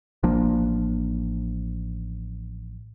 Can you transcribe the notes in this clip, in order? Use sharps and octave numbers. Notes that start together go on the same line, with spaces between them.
A1 F3 A#3 D4